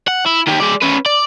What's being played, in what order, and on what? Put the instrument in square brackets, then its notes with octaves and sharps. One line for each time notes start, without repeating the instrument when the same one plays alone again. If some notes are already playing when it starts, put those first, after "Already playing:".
[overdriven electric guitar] F#5
E4
D#3 G4
G#3 D5
C#4 B4
D5